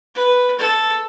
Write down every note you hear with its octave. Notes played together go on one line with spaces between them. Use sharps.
B4
A4